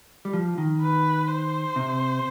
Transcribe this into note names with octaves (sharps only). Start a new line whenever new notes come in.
G3
F3
D#3
B4
C5
C3